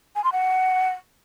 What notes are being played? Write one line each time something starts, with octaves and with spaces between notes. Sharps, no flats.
G#5
C6
F#5